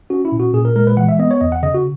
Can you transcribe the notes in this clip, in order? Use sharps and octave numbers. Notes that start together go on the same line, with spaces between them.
C#4 F#4
E4
A#2
F#4
A#2 G#4
A#4
G#3 A#4
B4
E3 F#5
E5
B3 D#5
C#5
E2 D#5
F#5
C#3 D#5
F#4